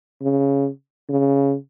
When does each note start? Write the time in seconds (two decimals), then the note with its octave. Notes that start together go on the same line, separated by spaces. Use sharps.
0.22 C#3
1.09 C#3